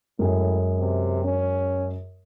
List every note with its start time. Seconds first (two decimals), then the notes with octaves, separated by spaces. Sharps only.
0.19 F#2 A2 G#3 G#4
0.79 C3
1.25 C#4